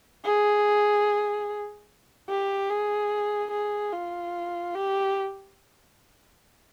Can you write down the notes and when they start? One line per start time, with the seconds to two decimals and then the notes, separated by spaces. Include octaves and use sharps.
0.25 G#4
2.29 G4
2.70 G#4
3.51 G#4
3.92 F4
4.75 G4